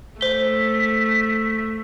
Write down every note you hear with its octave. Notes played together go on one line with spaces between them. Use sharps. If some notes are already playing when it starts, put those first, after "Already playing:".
A3 C5 B6 G7